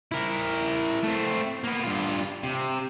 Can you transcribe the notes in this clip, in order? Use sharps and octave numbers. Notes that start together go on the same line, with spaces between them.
E4 A#4
A3 C4
A#3 B3
G2 F4
C3